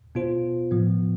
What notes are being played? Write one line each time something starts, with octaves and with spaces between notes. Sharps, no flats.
B2 B3 F4 C5
A2 F3 B3